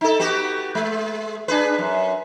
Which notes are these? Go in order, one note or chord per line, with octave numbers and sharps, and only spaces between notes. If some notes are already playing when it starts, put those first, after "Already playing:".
D#4 A4
B3 F#4 G4
G#3
D4 G#4 B4
F#2